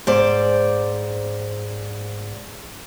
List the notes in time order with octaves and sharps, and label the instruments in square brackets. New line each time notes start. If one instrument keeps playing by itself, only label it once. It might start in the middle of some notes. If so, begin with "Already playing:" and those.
[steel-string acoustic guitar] G#2 C5 D5